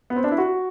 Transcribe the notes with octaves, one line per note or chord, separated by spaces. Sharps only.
B3
C4
D4
E4
F#4